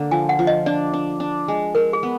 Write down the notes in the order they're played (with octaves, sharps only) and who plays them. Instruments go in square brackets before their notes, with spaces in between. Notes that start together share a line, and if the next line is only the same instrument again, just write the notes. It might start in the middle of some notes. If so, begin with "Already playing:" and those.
Already playing: [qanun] D3 A#3
[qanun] F3 [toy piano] G#5
[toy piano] F#5
[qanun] F3
[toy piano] D#5
[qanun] D4 [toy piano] D5
[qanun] D4
D4
G#3
[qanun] G#3 [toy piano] A#4
[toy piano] G#4
[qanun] B3